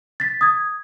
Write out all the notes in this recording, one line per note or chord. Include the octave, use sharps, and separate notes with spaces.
A6 B6
D#6 G#6